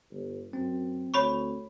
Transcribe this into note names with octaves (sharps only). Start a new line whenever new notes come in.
G1
F#2 C4
D2 C#5 B5 C#6